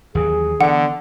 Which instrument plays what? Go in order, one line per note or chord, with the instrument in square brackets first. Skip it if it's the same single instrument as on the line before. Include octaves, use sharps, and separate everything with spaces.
[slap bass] D#2 E3 F#3 [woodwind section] G#4
[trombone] D3 [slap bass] E3 [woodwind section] B3 [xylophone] F#5